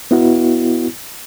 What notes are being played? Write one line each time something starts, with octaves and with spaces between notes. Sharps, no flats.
B3 E4 F#4